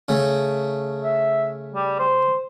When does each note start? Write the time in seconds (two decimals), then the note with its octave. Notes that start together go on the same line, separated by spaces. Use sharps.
0.09 C#3 A3
1.04 E5
1.74 G3
1.99 C5